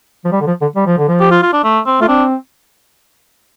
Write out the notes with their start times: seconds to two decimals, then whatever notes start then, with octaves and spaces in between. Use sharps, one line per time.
0.25 F3
0.32 G3
0.41 D3
0.47 F3
0.62 D3
0.76 G3
0.87 F3
0.98 D3
1.08 F3
1.20 G4
1.31 F4
1.42 F4
1.53 D4
1.64 A3
1.86 C4
2.01 A3 F4
2.08 C4 D4